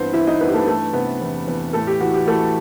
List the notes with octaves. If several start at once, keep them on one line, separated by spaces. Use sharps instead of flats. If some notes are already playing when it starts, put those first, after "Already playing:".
Already playing: G2 E3 B3 C4 B4 C5
E3 E4 E5
D#4 D#5
G2 B3 B4
G4
A3 A4
E3 A3 A4
C3 B3 B4
E2
E2
A2 A3 A4
G4
E3 F#4
G4
E3 A3 A4